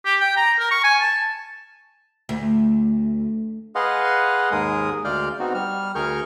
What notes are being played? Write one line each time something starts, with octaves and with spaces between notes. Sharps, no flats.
G4
G5
A#5
A#4
C#6
G#5
A5
D2
G#4 B4 D#5 F5 F#5 C6
D#2 G#2 G#3 G#4 A#4 D#6
D2 G#3 D5 F5 F6 G6
B3 C4 D#4 F#4
G3 F6
D2 G#4 A#4 C#6 F6 G6